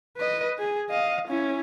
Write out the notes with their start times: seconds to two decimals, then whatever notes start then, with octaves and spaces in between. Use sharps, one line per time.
0.17 B4 D#5
0.59 G#4
0.90 D#5 F5
1.28 C#4 E4